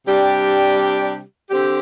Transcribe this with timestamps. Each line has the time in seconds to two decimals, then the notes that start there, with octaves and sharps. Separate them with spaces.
0.07 C3 G3 D4 G4
1.51 D3 C4 G4